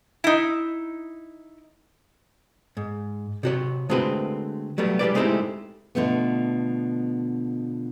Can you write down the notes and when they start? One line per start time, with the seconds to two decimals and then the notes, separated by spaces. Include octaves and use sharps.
0.24 D#4 E4
2.77 G#2
3.43 C3 F#4 C#5
3.89 D3 G#3 A3 C4 F#4 B4
4.78 F#3 G3 A3 B3
4.99 G3 G#3 B4 D5
5.15 G#3 A3 C4 D#4 E4 G4
5.95 B2 D3 F3 A3 B3